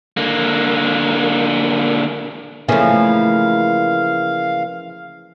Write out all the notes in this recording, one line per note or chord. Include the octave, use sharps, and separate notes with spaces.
D3 A#3
C#3 E3 F3 A3 A#3 F5